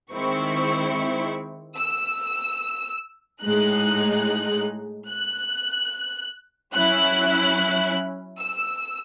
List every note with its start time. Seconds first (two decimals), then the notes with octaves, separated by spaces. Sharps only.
0.12 D#3 G#3 C4 E4 C#6
1.77 E6
3.43 A2 G#3 D#4 F#6
5.09 F#6
6.75 F#3 C#4 E4 F#6
8.40 E6